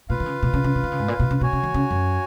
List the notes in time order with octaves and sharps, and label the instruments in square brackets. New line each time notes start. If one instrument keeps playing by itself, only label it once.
[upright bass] A#2 [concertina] F4 B4 F5
[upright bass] D#3
C#3
B2
C#3
C#3
C#3
D#3
C#3
G#2
A#2
B2
C#3
[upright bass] B2 [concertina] F#4 C#5 G#5
[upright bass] C#3
D#3
C#3
F#2